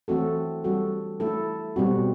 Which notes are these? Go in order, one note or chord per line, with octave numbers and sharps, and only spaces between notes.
E3 A3 C4 F#4 A4
G3 C4 F#4 A4
A3 E4 A4
B2 G3 C4 F#4